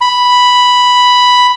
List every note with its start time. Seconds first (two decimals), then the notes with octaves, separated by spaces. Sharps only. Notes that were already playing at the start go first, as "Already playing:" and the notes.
0.01 B5